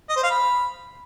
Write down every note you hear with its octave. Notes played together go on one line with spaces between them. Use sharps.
D#5
C5
F5
B5